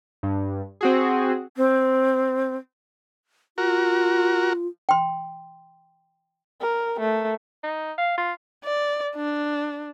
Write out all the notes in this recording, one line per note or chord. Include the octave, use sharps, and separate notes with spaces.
G2
C4 F#4 G#4
C4
F4 F#4 A#4
G5 C6
A#4
A3
D#4
F5
F4
D5
D4